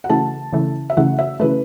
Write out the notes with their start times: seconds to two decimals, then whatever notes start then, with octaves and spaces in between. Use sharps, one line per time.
0.04 F#5
0.09 C#3 E3 A3 A5
0.53 C#3 E3 A3
0.90 E5
0.97 C#3 E3 A3 F#5
1.19 E5
1.40 C#3 E3 A3 B4